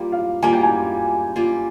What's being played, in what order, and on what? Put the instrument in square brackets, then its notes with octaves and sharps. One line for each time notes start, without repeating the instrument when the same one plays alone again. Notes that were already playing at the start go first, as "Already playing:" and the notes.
Already playing: [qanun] G3 A#3 F4
[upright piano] F5
[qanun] G3 A#3 F4 [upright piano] G#5
[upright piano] G5
G#5
[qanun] G3 A#3 F4